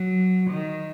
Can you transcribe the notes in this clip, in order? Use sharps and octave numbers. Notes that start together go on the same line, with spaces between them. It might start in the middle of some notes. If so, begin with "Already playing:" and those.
Already playing: F#3
D#3